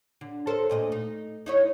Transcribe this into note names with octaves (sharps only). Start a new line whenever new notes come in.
D3
A4 A#4 C5
D2 A#2 D#5
D#4
D#4 E4 C#5